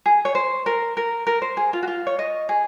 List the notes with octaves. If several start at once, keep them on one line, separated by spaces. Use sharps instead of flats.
G#4
C#5
C5
A#4
A#4
A#4
C5
G#4
F4
F#4
F4
C#5
D#5
G#4